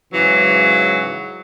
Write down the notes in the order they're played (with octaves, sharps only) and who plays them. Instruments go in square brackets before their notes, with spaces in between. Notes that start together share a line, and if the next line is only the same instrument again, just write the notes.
[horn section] G#2 C#3 E3 F#3